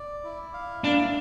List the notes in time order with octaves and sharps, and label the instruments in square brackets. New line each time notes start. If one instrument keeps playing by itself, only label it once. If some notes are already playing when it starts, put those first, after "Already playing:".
Already playing: [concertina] D5
E4
F5
[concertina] A#3 [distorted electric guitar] D4